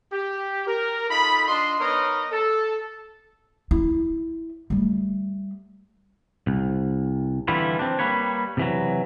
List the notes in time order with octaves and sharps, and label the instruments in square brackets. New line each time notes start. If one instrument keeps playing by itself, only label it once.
[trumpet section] G4
A#4
D#4 F4 A4 D#5 B5
D4 F4 D#5 C6
B3 D#4 A#4 B4 C#5 D#5
A4
[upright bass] E4
G3 A3
[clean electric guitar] C2
D3 E3 G3 E4 F4
C4 D4
G3 A#3 B4 C#5
C3 E3 F#3